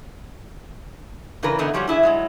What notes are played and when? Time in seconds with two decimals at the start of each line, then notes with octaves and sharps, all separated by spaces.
1.43 C#3 E3 D4 A#4 B4
1.59 D3 E3 A3 B3 D#4
1.74 F3 G3 C#4 F#4 C#5
1.87 D4 E4 G#4 E5
2.03 F#3 G#3 E4